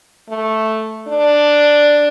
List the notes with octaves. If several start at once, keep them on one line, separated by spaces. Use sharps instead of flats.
A3
D4